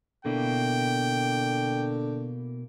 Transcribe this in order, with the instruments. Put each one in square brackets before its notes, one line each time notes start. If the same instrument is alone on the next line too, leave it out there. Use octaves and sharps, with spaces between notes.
[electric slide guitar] B2 A#3 E4 [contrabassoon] D3 [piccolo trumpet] G5